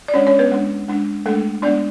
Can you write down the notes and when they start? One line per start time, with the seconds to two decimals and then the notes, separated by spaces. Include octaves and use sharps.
0.08 D5
0.14 G#3 C#4 D4 C#5
0.27 C#4 C#5
0.39 B3 B4
0.51 G#3 D4
0.88 G#3 D4
1.25 G#3 A3 D4 A4
1.62 G#3 B3 D4 D5